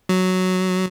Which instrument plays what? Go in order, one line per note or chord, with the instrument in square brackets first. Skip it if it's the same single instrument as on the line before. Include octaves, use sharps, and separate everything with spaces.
[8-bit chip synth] F#3